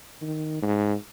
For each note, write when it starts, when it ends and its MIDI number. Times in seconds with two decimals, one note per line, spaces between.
0.21 0.58 51
0.62 0.94 44